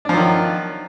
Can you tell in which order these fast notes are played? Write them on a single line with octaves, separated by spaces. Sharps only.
D4 F3 F#3 D#3